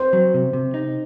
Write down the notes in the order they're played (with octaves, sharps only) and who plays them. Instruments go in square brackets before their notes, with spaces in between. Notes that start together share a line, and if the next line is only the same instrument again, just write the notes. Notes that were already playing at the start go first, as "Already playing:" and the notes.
Already playing: [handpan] C5
[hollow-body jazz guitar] F#3
C3
C3
D#4